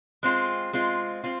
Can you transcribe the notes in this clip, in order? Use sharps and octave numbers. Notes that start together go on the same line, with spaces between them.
G#3 C4 F4
G#3 C4 F4
C4 F4